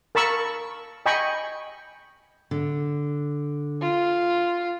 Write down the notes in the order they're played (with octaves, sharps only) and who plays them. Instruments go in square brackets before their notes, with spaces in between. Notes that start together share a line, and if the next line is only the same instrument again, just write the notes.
[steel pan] A#4 A5 B5 C#6 E6
D#5 G5 G#5 B5 C#6
[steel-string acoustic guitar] D3
[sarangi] F4